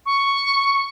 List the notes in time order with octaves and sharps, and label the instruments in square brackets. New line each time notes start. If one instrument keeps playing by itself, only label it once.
[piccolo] C#6